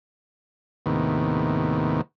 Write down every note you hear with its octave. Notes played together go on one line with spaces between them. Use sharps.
D#2 A2 C3 D#3 B3